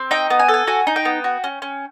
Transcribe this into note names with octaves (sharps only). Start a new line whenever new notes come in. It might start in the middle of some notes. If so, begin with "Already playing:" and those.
Already playing: C4
D#4 G5
B3
G#5
A4
G#5
F#4 G#5
D#4
G5
B3
F#4
C#4
C#4